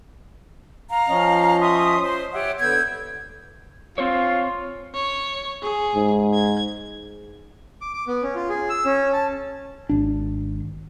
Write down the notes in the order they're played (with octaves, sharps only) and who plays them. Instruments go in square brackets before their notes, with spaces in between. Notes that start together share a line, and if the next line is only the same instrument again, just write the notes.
[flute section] F5 A#5
[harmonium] F3 C#4 D#5
[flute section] E5 C6 D#6
C5
[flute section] G4 C#5 [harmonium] E5 F#5
[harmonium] D3 B3 [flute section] E6 G6 G#6
[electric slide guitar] C4 C5 C#5 [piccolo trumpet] F4
[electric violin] C#5
G#4
[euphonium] G#2
[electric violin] G#6
[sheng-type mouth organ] D6
D6
B3
C#4
F4
G#4
E6
C#4
A5
[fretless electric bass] G#1 D4